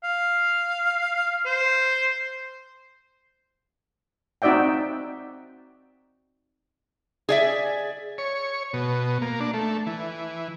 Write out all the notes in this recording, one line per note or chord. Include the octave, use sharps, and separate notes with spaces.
F5
C5
C4 D#4 F#4 D5 E5 G5
G#4 D5 E5
C#5
B2
A#3
D4
A3
E3